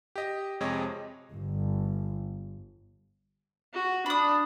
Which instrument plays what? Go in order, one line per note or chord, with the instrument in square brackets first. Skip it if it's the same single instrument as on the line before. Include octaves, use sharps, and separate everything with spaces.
[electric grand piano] G4 D#5
F2 C3 G#3 C#5 D#5
[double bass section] G1
[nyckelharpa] F#4
[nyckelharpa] D4 [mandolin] B5 D#6